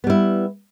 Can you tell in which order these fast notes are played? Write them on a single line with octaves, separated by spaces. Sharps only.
B3 G3 E4